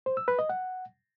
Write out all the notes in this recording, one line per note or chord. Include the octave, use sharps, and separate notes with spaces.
C5
E6
B4
D#5
F#5